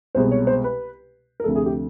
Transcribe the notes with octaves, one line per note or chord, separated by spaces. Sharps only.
C2 B2 G#3 C5
C#5
C5
B4
A#4
D2 C3 F3 A3 A4
G#4
G4